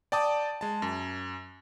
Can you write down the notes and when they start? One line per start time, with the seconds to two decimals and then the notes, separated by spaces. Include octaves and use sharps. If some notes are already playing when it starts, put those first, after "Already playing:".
0.12 D5 G5 A5 D6 D#6
0.61 G#3 A5
0.82 F#2